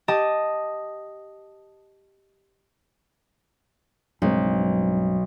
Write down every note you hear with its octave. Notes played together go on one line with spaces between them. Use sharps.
G4 D#5 A5 D#6
B1 G2 G#3 C4